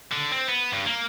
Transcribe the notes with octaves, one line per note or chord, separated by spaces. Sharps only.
D3
C4
B3
G2
A#3